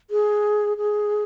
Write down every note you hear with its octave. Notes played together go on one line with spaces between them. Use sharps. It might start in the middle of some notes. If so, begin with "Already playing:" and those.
G#4
G#4